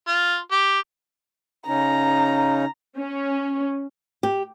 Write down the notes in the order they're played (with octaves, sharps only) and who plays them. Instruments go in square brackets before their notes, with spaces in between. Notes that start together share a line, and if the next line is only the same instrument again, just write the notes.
[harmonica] F4
G4
[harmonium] C#3 C#4 D#4 [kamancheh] A#5
[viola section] C#4
[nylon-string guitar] G4